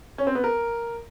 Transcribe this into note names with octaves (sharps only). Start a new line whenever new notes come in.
C#4
C4
B3
A#4